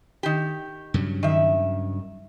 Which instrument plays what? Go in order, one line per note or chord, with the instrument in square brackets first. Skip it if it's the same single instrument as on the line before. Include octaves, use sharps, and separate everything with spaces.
[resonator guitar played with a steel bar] D#3 G4
[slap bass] G2 C#3 F#3
[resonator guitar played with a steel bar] D#3 E5